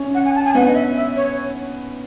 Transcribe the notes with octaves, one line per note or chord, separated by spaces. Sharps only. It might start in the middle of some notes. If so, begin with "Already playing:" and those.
Already playing: C#4
F#5
G#5
A5
G#5
B3 F#5
D#5
E5
E5
C#5